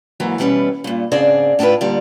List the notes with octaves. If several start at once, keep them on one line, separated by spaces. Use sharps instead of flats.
G#2 E3 F#3 A#3
B2 E3 G3 C4 C#4 B4
G2 A#2
G#2 C#3 C4 D4 G#4 D5
A2 D4 D#4 F4 B4
A#2 D3 G3